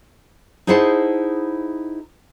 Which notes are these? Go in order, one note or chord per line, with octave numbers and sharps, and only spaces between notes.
D#4 E4 G#4 C5 F#5 A5